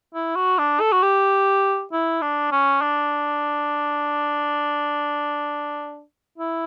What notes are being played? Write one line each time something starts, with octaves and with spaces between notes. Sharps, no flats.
E4
F#4
D4
A4
F#4
G4
E4
D4
C#4
D4
E4